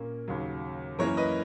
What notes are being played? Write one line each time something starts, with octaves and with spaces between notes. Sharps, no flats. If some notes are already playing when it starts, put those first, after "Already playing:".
Already playing: A#2 A#3 C#4
D#2 C#3 F#3
F#2 E3 A#3 C#4 A#4 C#5
B4 D#5